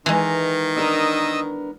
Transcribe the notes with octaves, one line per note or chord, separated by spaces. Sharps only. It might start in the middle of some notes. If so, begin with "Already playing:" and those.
D#3 E3 G#3 A#5
B3 D4 A#4 D#5 D#6 E6